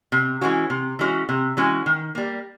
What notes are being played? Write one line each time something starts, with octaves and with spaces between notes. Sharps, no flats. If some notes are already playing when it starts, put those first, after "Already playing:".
C3
E3 G#3 C#4 F#4
C3
E3 G#3 C#4 F#4
C3
E3 G#3 C#4 F#4
D#3
G3 A#3